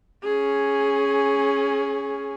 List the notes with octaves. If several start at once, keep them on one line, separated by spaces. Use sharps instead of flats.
C#4 G#4